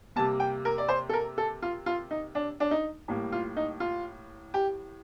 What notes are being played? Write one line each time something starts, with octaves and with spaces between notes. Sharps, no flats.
C3 G3 A#3 A5
G5
A#4
D5
C5
A4
A#4
A4
F4
F4
D#4
D4
D4
D#4
A2 G3 A#3
F4
D#4
F4
G4